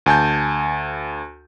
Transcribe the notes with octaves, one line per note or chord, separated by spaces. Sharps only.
D2 G#5 A5 G6